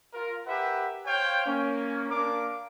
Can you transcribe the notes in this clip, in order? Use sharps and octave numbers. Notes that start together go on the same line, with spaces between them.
F4 A#4
G4 A#4 B4 E5 F#5
C5 C#5 F5 G5
A#3 C#4
A#3 D4 A#4 F5 D6